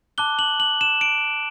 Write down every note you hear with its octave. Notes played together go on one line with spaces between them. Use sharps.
A5 D6 F#6 G7
F#7
F#7
E7
D7